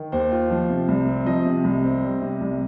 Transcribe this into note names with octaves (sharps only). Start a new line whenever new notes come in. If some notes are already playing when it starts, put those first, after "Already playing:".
Already playing: D#3
D#2 C5
F4
F3
C3
C2
C4
F3 D#5
C3
C2
C4
G3
C3
C2